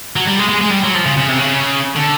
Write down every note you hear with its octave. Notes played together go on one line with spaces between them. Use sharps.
F#3
G3
G#3
G#3
G#3
G3
F#3
F3
C#3
C#3
C3
C#3
D3